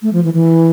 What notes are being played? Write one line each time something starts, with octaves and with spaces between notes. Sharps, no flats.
A3
F3
E3
E3